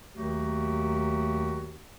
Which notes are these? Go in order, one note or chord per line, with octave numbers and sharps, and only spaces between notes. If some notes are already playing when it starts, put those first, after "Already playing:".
D#2 D#3 F#3 A3 F#4 G4